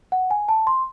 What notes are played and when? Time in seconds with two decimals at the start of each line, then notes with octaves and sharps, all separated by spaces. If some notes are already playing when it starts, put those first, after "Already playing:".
0.12 F#5
0.31 G#5
0.49 A5
0.67 C6